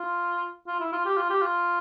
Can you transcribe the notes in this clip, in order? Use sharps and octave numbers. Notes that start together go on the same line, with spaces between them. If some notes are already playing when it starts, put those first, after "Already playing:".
Already playing: F4
F4
E4
F4
G4
F4
G4
F4